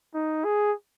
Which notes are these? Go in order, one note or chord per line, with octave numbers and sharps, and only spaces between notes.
D#4
G#4